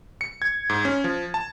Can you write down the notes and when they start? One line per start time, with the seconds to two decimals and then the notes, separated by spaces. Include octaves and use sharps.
0.21 C#7
0.42 G#6
0.69 G#2
0.85 C#4
1.04 F3
1.34 A5